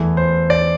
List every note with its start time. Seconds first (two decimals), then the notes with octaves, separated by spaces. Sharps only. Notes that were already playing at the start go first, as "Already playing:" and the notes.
Already playing: E2 E3 A3
0.17 C5
0.50 D5